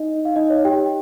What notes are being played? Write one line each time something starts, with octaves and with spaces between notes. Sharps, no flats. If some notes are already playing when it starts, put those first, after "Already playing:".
Already playing: D#4 D#5
F5
D#4 D#5
C#5
G4 G5